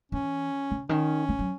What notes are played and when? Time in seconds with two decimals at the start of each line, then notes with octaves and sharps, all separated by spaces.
0.12 E3 C#4
0.71 C#3
0.89 D#3 C#4
1.29 E3
1.39 F#3